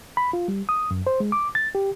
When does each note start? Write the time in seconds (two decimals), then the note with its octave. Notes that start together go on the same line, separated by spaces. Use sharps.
0.17 B5
0.33 F4
0.48 G3
0.69 D#6
0.91 F#2
1.07 C5
1.20 G#3
1.32 D6
1.55 A6
1.75 G4